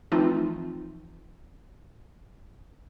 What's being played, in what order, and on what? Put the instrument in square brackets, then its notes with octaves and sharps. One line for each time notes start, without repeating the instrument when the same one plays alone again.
[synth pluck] E3 F3 A3 C4 D#4 F4